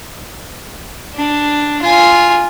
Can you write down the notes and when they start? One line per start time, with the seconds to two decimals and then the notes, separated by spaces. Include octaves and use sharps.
1.15 D4
1.82 F4 G#5